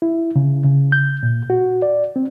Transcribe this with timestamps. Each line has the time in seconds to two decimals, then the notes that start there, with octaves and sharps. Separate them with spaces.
0.02 E4
0.36 C#3
0.65 C#3
0.92 G6
1.23 A#2
1.50 F#4
1.82 D5
2.16 C4